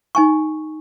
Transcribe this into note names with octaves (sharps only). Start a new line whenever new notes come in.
D#4 G#5 C#6